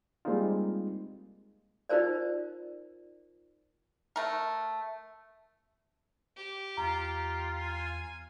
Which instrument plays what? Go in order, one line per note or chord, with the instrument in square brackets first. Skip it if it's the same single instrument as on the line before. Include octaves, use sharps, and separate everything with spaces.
[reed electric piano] G3 G#3 A#3 C4 D#4 F4
[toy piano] D#4 F4 A#4 C5 D5
[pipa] A3 A#4
[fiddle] G4
[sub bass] E2 [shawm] F4 [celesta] A#5
[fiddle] G#5